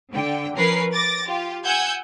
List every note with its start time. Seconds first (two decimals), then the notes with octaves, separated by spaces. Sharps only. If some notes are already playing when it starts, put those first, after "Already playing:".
0.12 D3 G5
0.54 F3 C#4 A#4 B4 C7
0.94 D6 A6 A#6
1.24 F4 G4
1.65 F#5 G#5 E6 G6 G#6